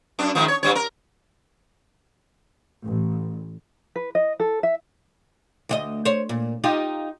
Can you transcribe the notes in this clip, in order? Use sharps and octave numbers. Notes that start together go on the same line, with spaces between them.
F#2 D4
G#2 D#3 F3
C#5
G2 G3 C#5
A#4
A1
B4
D#5
A4
E5
D2 F#4 D#5
C5 C#5
A#2
D#4 F4 G4